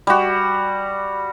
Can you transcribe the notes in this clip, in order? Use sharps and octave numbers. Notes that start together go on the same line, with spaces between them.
G3 F#4